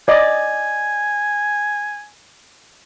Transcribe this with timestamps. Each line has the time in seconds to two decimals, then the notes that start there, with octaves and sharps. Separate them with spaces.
0.08 D5 D#5 G#5